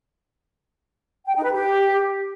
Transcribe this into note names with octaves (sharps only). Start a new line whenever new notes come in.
G5
D#4
B4
G4